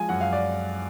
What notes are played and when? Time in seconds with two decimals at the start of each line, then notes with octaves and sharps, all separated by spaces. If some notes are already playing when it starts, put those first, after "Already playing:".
Already playing: F3 G#3 G#5
0.09 F#2 F#5
0.21 F5
0.33 D5